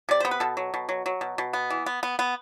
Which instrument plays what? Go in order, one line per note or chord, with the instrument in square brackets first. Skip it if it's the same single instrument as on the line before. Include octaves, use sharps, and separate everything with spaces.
[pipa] C3 D5
B3 C5
B4
B2 A4
F#3
B2
F#3
F#3
B2
B2
B3
E3
B3
B3
B3